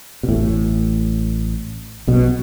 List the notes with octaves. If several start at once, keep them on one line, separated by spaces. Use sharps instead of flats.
B2
A1 A2
B1 B2